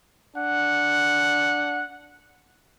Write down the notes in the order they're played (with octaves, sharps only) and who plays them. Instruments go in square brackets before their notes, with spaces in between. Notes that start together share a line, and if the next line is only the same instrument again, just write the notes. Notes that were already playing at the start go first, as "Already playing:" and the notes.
[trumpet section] D4 F#5